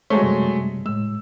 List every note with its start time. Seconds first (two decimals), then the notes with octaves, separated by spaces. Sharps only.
0.10 F#3 G#3 A3 C5 C#5 C#6
0.22 F#2 C3 G3
0.86 A2 G#3 E6